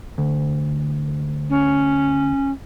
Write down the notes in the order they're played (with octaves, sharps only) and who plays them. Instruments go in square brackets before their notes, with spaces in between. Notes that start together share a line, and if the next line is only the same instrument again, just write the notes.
[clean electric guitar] D2
[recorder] C#4